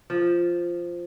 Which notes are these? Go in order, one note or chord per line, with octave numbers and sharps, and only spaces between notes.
F3